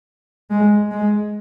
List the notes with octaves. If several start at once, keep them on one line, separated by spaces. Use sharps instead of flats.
G#3
G#3